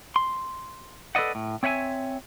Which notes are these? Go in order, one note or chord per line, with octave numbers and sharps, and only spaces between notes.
C6
A4 B4 D5 D#5 F#5
A2
C4 C#5 E5 F#5 G#5